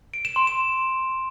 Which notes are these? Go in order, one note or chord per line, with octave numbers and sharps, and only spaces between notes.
D7
E7
C6
E7